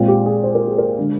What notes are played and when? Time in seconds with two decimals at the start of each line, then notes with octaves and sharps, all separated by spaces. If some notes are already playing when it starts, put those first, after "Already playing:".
Already playing: A#2 G#3 C4 F4
0.08 G4
0.26 G#4
0.43 C5
0.55 A#4
0.67 G#4
0.78 A#4
0.98 D3 G#3